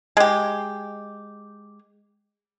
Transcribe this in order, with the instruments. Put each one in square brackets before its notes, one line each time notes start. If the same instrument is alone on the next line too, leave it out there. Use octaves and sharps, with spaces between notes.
[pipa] G#3 G4